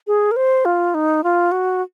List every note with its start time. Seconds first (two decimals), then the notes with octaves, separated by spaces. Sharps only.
0.07 G#4
0.31 A#4
0.36 C5
0.65 F4
0.94 D#4
1.24 F4
1.52 F#4